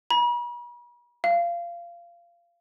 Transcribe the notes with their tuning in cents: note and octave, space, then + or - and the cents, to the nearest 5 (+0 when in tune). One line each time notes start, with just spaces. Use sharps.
B5 -45
F5 -20